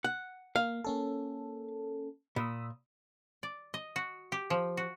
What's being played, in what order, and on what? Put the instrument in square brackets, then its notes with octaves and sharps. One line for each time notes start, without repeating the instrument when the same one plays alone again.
[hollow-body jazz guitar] F#5
[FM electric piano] A#3 [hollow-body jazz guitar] F5
[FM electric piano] A#3 C#4 A4
[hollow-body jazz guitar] A#2 [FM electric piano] B5 D#6 E6
[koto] D5
D#5
F#4
G4
F3
F#4